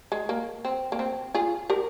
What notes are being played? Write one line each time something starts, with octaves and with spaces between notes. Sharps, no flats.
G#3
A#3
C4
A#3
C4
F4 G#4
G4 A#4